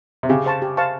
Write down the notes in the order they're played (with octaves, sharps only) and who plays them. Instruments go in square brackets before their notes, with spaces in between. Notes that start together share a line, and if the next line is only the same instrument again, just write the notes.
[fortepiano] C3
[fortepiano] C#3 [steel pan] G4
[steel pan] C5 F5 A5 C#6
G4
C5 F5 A5 C#6